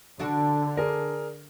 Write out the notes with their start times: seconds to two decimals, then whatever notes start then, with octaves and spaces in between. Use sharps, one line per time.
0.20 D3 D4 F#4 A4
0.76 G#4 A#4 D5